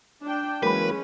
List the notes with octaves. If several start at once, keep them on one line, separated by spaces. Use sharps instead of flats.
D4 G5
E3 F#3 G#3 A#3 C#4 A#4 B4 B5